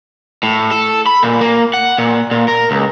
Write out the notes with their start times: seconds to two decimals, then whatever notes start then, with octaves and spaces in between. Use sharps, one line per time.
0.43 A2
0.71 A4
1.06 B5
1.23 A#2
1.41 A#3
1.74 F#5
1.98 A#2
2.31 A#2
2.48 A#4
2.71 C#2